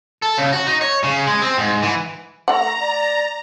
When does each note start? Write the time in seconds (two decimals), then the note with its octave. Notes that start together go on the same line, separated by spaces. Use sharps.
0.22 A4
0.37 C#3
0.53 F#4
0.67 D#4
0.81 C#5
1.03 C#3
1.27 G#3
1.42 C4
1.58 G#2
1.82 E3
2.48 A3 F#5 A#5
2.81 D5